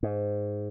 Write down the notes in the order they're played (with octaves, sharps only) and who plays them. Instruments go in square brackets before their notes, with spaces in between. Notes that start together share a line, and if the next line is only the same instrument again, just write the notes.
[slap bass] G#2